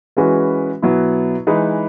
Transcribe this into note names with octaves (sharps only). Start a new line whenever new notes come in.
E3 G#3 C#4 F#4 B4
B2 F#3 B3 E4
E3 G#3 D#4 G#4 B4